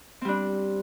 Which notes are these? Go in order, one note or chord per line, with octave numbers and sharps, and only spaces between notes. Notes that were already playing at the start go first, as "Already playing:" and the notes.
G3 C4 D4